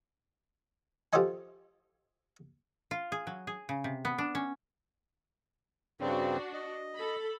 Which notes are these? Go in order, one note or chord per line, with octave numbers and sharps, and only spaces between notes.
F3 G4 A4 C5 D#5 G#5
F4
G#4
F#3
G#4
C#3
C3
B3
D4
C#4
G2 C#3 C4 D4 F#4
D#5
A4 B5